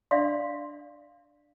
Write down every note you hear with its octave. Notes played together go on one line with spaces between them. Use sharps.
D4 D5 E5 F5 C6